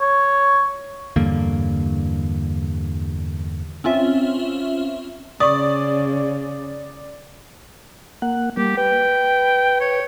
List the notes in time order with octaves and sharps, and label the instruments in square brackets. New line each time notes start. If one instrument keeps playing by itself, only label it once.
[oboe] C#5
[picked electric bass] E2 G2 D3 A#3
[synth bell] C4 C#4 F4 E5
[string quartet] C#3 [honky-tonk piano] D5 [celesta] C#6 D#6
[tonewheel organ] A#3 F#5
[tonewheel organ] G3 A#3 [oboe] G4
[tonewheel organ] B4 [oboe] G5
[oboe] C#5